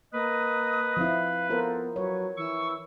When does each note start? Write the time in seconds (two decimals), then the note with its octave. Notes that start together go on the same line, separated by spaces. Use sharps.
0.13 A#3 B4 D#5 D#6
0.97 F3 C4 E4 F5
1.50 B3 F4 A4 A#4 C5
1.96 F#3 B4 C#5
2.37 E3 C#6 E6